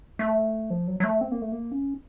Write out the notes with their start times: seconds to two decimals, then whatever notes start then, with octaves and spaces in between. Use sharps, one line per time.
0.19 A3
0.70 F3
0.87 F#3
1.00 F#3
1.04 A3
1.21 C4
1.32 A#3
1.42 A3
1.52 A#3
1.72 C#4